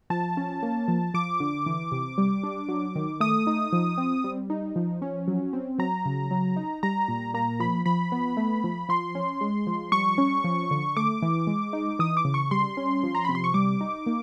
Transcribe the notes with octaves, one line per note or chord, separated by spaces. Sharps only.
F3 A5
C#4
A#3
F3
F3 D6
D3
E3
C3
G3
D4
F#3
D#3
A3 D#6
D#4
F3
C4
G3
D#4
F3
C#4
F#3
C4
F#3 A#5
C#3
F#3
D#4
G3 A#5
A#2
A#3 A#5
F3 B5
F3 B5
B3
A3
F3
F3 C6
C#4
G#3
F3
G3 C#6
C#4
F3
D3
A3 D6
E3
G#3
D#4
E3 D#6
D6
C#3
C#6
G3 C6
C#4
F3
A#5
C3 B5
C6
C#6
G3 D6
D#4
A#3